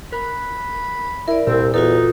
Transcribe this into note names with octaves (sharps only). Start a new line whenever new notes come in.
A#4 B5 F#6
E4 A#4 D5
C2 A#2 C4 E6
E2 D#4 F4 F#4 A4